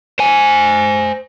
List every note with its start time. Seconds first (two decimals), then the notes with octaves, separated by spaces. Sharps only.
0.19 C5 G#5